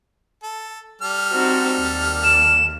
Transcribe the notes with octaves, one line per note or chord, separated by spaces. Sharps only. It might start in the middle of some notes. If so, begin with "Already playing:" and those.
A4
G3 A4 F6
C4 D#4 F#4
D#2
E7